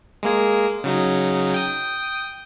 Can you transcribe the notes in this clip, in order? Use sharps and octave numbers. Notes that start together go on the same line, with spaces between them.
G#3 A#3 G#4
C#3 F#3 D#4
G5 D#6